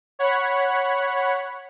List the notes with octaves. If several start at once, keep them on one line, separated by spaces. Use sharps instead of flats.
C#5 F#5 B5